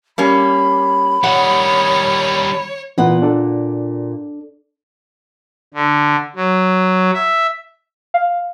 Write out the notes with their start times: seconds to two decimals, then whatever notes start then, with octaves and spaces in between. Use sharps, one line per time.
0.18 G3 A#3 C#4 B5
1.24 D#3 G3 C#5 F#5
2.98 A#2 E3 B3 F4 F#5
3.22 D4 A4 D5
5.74 D3
6.36 F#3
7.14 E5
8.14 F5